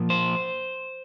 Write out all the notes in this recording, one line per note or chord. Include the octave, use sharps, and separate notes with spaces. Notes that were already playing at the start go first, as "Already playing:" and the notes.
Already playing: A#2 F3 A#3
C5